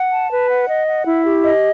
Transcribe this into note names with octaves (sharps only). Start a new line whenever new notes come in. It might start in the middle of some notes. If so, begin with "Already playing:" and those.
Already playing: F#5
A5
B4
F#5
D#5
F#5
E4
G4
D#5